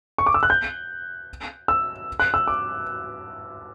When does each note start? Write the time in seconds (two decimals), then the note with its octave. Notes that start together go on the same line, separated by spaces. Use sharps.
0.18 C#6
0.26 D6
0.34 E6
0.43 F#6
0.50 G6
1.68 E6
2.20 F#6
2.34 E6
2.47 D6